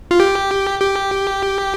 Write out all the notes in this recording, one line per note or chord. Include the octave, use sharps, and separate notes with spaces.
F4
G4
G4